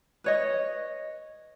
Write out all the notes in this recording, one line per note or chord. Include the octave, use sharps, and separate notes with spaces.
B4 C#5 D#5